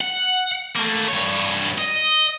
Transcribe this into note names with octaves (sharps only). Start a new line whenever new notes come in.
F#5
A3 A#3
G2 C#5
D#5